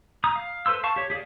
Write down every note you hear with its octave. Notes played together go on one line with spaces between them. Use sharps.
A#5 D#6
F5
A4 B4 C5 C6 E6
F5 A5 C#6
G4 C#5
G4 G#4 D5 F5